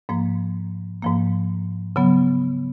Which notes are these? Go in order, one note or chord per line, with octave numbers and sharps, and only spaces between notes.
G#2 F3 A#3
G#2 F3 A#3
C#3 F#3 B3